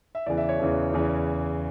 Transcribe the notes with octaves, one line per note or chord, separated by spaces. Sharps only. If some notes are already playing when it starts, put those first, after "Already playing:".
E5
E2 C#3 E3 D5
E5
C#5
E2 C#3 E3
E2 C#3 E3